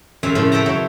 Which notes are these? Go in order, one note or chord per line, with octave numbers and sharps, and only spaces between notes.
F2 C#3 G3 E5 F5 G#5
A2 C#3 F3 A3
A4 B4 E5 G5 A5 A#5
F#3 E4 C#5 G5